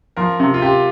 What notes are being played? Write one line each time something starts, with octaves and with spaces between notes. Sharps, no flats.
F3 A#4
C3
F4
C3 G4